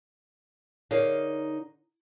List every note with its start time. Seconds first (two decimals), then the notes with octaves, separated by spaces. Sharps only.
0.91 D3 D#4 G#4 A#4 C#5 F5